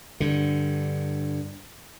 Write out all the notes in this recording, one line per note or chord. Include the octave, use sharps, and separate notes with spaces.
G2 D3